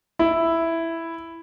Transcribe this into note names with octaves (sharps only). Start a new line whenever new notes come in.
E4